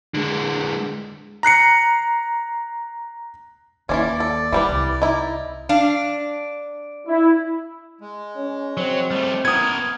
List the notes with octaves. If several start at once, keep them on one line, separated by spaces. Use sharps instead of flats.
D3 G#3
A#5 F#6 C7 C#7
D#2 E3 F3 C#4 D5
A4
E3 F#3 G3 B4
C2
D#4 E4
D4 F5
E4
G#3
C#4
F#3 C4
G3 A3
E3 B3 A#4 D#6 G#6